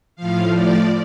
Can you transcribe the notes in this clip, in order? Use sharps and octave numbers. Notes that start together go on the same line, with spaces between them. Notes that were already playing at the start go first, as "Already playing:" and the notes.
A2 F3 F5
D5